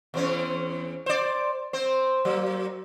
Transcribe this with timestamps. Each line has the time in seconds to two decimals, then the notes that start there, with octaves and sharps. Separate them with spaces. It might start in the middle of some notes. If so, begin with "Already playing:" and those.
0.14 E2 C4 C#4
1.06 C5 D5
1.73 C4 C5
2.25 F#3 A#3